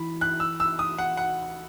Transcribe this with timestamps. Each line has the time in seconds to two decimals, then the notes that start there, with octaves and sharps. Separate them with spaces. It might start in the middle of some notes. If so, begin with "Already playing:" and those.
Already playing: E3 B5
0.21 F#6
0.40 E6
0.60 E6
0.79 D#6
0.98 F#5
1.17 F#5